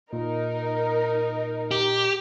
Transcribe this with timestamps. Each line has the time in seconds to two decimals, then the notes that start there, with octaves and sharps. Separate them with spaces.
0.13 A#2 D#4 A#4
1.71 G4